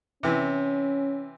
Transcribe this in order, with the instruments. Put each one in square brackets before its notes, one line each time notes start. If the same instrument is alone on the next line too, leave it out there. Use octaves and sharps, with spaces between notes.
[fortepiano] C3 E3 [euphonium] C#4